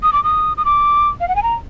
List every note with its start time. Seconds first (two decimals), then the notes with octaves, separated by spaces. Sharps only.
0.03 D#6
0.13 D6
0.24 D#6
0.58 D#6
0.65 D6
1.20 F5
1.28 F#5
1.36 G#5
1.43 A#5